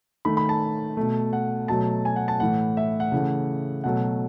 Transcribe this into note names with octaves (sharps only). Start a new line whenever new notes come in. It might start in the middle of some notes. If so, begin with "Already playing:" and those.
D#3 A3 B5
B5
A5
B2 A3
F#5
B2 F#3 A3 A5
G#5
F#5
A5
A2 E3 A3 F#5
E5
F#5
C#3 E3 A3
B2 F#3 A3 F#5